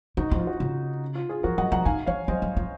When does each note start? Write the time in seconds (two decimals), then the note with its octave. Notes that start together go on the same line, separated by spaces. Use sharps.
0.17 D#3 D#4 F#4
0.31 F3
0.39 F4
0.47 F#4
0.57 C#3 F4
1.15 F4
1.29 F4 G#4
1.43 F3 F#4 A#4
1.58 F#3 D#5 F#5
1.72 F3 F#5 A#5
1.85 D#3 F5 G#5
2.06 F3 C#5 F5
2.28 F#3 C5 D#5
2.42 F#3
2.57 F3